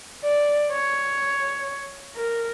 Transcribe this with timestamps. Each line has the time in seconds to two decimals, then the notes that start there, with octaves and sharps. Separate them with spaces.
0.24 D5
0.73 C#5
2.16 A#4